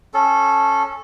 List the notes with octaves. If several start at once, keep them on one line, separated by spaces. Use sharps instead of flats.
C#4 A4